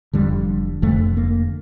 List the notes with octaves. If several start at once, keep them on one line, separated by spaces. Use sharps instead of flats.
F1 F2 D3 G3
F1 F2 D3 A3
A#3